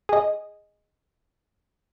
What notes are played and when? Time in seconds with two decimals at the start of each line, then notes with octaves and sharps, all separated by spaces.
0.09 G#4 D#5